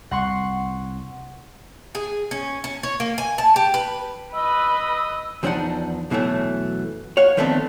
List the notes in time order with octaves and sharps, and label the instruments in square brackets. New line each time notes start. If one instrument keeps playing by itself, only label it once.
[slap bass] C2 [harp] F#5 C6 C#6
[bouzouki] G#4
C#4
C#4
C#5
A#3
G#5
A5
G4
B4
[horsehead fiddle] B4 [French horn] D#5 [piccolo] E6
[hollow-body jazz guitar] E2 F3 C4 D4 D#4 F#5
F#2 B2 E3 F#3 A3
C#5 F5 F#5
D#3 F3 A3 B3 C4 D4